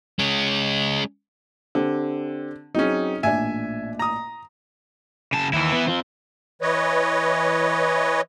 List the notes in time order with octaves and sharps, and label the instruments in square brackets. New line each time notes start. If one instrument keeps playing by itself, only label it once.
[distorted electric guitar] G#3 C#4
[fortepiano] D3 [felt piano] C4 G4 C5
[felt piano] F#3 C4 G#4 [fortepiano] C#4 D#4
[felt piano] A1 A#2 D4 [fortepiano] E5 G#5
[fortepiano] A#5 D#6
[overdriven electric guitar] C#3 A5
[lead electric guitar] D#2 [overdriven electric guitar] E3 E4
[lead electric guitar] B3
C4 F4
[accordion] E3 B4 C#5 D#5